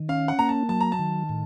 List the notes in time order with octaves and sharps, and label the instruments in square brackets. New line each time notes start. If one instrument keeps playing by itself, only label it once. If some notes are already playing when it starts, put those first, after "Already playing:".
Already playing: [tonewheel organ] D#3
[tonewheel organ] C#4 [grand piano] F5
[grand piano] F#5
[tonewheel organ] A#3 [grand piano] A#5
[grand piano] A5
[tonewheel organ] F#3 [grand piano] A5
[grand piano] A#5
A5
[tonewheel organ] D#3
A2